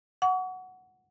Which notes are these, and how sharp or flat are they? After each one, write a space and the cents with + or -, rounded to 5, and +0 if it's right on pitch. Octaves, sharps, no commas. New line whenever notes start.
F#5 +0 C#6 +40